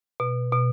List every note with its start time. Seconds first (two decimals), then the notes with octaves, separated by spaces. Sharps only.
0.20 B2
0.53 B2